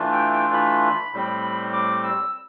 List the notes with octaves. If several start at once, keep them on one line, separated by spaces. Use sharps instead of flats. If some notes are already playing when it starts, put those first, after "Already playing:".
Already playing: E3 A3 D4 F4
G5
G5
B5
A2 G3 C4
D6
E6